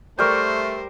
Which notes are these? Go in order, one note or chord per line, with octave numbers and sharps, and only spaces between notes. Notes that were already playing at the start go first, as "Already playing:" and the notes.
G3 A3 A#4 C5 C#6 F6 G6